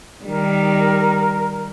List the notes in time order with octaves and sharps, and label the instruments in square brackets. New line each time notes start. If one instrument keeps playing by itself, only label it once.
[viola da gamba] D#3 G3 [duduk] A#4